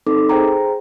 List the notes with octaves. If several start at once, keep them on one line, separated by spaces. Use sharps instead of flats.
C4 D#4 A4 D6
G#4 C5 G5 A#5